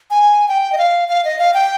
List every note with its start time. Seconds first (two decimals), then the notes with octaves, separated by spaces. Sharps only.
0.10 G#5
0.48 G5
0.72 D#5
0.78 F5
1.08 F5
1.25 D#5
1.39 F5
1.54 G5